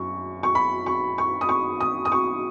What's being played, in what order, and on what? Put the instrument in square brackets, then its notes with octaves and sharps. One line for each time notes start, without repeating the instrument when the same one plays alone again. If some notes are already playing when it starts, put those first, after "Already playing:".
Already playing: [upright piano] F#2 C#6
C#6
B5
C#6
C#6
D#6
C#6
D#6
D#6
C#6